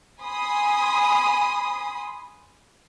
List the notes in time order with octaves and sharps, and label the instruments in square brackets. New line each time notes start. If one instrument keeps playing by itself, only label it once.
[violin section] G#5 B5 C6 D#6